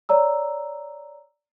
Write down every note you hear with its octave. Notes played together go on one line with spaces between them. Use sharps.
C#5 D5 A#5 E6